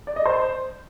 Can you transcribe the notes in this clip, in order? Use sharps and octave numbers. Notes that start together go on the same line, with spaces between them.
D5
D#5
C5